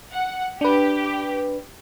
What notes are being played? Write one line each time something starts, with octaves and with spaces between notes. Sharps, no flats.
F#5
D4 G4 B4